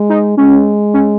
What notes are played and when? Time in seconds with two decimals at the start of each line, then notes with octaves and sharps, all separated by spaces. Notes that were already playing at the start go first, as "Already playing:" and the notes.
Already playing: G#3
0.10 D#4
0.37 G#3 C#4
0.94 C#4